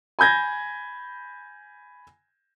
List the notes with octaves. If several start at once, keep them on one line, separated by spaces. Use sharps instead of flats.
G#5 B5 G6 G#6 A#6